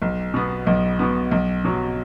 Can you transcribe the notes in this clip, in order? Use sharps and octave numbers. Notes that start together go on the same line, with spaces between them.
B1
B2 B3
B1
B2 B3
B1
B2 F#3